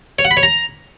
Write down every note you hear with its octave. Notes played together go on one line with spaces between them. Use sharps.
C#5
F#5
B5
C#5
A#5